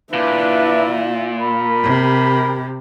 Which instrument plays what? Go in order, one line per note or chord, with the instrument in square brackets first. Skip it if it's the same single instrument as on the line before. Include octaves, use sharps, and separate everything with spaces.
[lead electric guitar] A#2 [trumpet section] D4 B4 [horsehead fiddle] E4 E5
[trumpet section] A#4 B5
[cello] C3 [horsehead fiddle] G4